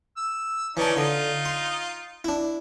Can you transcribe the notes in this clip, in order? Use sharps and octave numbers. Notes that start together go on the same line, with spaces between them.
E6
E3 C#4 D#4 D5 A5
D3 D#4 F4
C6
D4 E4